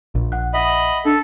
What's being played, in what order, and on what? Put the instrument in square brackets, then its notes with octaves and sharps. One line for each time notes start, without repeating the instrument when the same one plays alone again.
[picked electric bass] A#1
[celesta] F#5 F#6
[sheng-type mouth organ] D#5 B5 [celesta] E5 F#5
[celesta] D4 [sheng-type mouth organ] A4